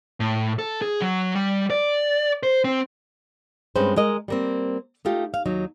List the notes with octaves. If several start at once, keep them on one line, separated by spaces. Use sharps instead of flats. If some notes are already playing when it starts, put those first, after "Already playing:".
A2
A4
G#4
F#3
G3
D5
C5
C4
G2 G#3 C4 C#4 B4 C5
G#3 A#4 D#5
G3 A#3 C4
A3 D#4 F4 G4
F5
D#2 F#3 D#4